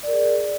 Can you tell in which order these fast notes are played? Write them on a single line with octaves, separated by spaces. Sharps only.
D5 A#4 G#4